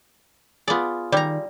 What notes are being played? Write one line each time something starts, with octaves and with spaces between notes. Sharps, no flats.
B3 F4 G#4 D5
D#3 G3 D5 A#5